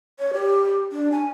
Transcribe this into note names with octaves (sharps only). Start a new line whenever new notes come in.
C#5
G4
D4
G#5